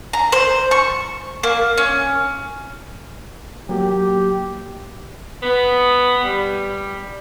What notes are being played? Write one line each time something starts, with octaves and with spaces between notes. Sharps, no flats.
A#5
C5
C#6
A#3
C#4
F#3 A#3 G4
B3
G3